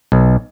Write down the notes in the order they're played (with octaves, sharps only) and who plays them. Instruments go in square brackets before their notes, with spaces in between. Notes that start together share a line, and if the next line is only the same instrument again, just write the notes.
[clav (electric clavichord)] B1